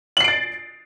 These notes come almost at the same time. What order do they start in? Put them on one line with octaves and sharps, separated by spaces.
F#7 C7 D7 A6